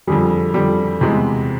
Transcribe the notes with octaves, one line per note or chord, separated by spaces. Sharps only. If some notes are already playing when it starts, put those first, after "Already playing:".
F2 D3 G3 G#4
F2 D3 G3
E2 C3 E3 G#3